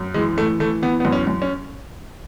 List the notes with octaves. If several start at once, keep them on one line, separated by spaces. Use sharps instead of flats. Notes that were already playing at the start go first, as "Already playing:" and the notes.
Already playing: F#2
E3 G#3
E3 A3
E3 A3
E3 B3
F#2 B3
C#4
F#2
C#4